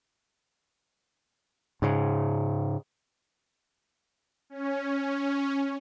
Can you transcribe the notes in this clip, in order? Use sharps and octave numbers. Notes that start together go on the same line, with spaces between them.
G#2 C#3
C#4